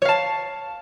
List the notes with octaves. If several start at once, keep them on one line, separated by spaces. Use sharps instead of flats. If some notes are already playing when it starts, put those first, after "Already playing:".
C#5 F5 A5